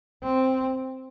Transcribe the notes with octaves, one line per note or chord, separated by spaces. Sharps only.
C4